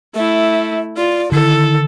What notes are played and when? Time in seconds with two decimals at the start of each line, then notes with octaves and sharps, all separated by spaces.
0.15 A3 E4 E5
0.97 F4 D5
1.32 D3 D#3 E4 A4